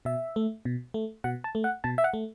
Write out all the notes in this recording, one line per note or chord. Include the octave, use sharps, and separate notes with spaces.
B2 E5
A3
B2
A3
B2 F#5
A5
A3
F#5
B2 A5
E5
F#5
A3